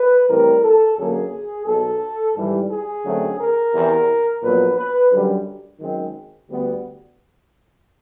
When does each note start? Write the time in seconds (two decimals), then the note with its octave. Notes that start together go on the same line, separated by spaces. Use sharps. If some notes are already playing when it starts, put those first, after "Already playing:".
Already playing: B4
0.29 A2 E3 G3 C4 A#4
0.63 A4
0.97 F#2 D3 F#3 A#3 G#4
1.66 B1 B2 F#3 A4
2.35 G#1 G#2 E3 G3
2.70 G#4
3.05 F#2 D3 F#3 A3 C4
3.39 A#4
3.73 E2 C3 E3
4.42 A#1 A#2 F#3 B3 B4
4.77 B4
5.11 F#2 D3 G3
5.80 F#2 D#3 G#3 C4
6.49 D2 D3 G3 B3